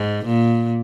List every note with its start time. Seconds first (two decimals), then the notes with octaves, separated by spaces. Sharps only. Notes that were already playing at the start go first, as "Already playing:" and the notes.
Already playing: G#2
0.25 A#2